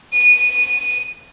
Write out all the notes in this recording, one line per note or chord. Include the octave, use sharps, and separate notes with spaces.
D#7